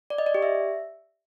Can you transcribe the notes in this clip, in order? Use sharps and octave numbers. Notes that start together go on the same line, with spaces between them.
D5
D#5
D5
G4
E5